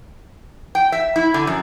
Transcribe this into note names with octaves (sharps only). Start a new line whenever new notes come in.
G5
E5
E4
D3
F#2